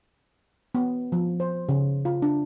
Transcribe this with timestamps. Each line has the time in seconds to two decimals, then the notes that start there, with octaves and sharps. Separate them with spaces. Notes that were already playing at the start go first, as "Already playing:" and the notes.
0.75 B3
1.12 F3
1.40 C5
1.69 C#3
2.05 F4
2.22 D4